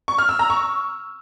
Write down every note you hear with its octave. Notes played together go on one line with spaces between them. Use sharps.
C#6
F6
E6
A#5
C#6